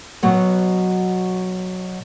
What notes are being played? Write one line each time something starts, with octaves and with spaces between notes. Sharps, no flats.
B2 F#3 F#5